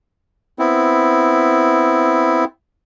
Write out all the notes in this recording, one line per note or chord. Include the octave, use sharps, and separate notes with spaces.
B3 C4 E4